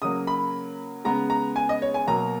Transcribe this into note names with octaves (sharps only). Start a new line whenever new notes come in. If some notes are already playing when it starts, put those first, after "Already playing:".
C#3 F#3 A#3 D#6
B5
C#3 G#3 B3 A#5
A#5
G#5
D#5
C#5
G#5
B2 F#3 A#3 A#5